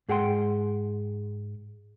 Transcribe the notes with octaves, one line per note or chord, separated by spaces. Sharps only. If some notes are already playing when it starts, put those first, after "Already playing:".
G#2 G#4 F#5 G5 C6